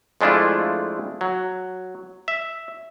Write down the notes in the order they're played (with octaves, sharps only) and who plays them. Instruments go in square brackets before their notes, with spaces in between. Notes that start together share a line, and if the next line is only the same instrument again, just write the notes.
[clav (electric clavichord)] F2 G#3 A3 D4 E4 F4
F#3
E5